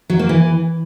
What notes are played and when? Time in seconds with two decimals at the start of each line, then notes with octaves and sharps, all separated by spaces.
0.10 F#3
0.19 A#3
0.29 E3